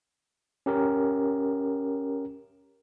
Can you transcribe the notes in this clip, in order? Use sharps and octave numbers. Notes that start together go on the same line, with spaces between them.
C#4 G4 A#4